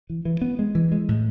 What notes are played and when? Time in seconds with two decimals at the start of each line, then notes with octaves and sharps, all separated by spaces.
0.10 E3
0.25 E3
0.41 B3
0.59 G#3
0.75 E3
0.92 G#3
1.08 A2